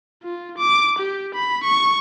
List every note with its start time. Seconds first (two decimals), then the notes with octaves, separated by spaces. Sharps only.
0.23 F4
0.58 D6
0.98 G4
1.35 B5
1.64 C#6